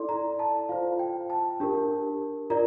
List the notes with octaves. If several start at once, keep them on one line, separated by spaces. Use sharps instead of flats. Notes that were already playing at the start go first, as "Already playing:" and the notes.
Already playing: E4 A4 D5 C6
A#5
A5
F4 C5 F5
G5
A5
D4 G4 A#4
F4 A#4 D5 A#5